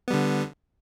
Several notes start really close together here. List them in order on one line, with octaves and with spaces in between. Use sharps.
B3 G3 D3